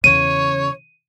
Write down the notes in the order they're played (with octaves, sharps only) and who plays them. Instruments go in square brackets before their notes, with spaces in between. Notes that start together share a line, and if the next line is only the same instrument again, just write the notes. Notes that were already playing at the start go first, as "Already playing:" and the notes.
[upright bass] E2 C#3 [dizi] C#5 [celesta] D#7